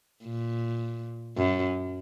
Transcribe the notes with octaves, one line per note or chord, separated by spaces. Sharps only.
A#2
F#2